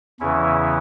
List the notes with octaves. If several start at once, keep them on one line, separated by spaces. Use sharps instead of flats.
E2 C#3 E3 C#4 E4